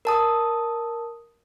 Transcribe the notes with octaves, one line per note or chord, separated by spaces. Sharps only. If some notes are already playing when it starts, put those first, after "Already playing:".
A#4 A5 D#6